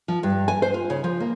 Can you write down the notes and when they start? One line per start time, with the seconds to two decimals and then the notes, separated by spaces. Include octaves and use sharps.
0.08 F3
0.23 G2
0.48 G#5
0.62 C5
0.74 F4
0.90 C#3
1.04 F3
1.20 A#3